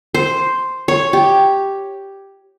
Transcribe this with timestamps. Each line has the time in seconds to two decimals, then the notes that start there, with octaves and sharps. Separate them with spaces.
0.14 C5
0.88 C#5
1.13 G4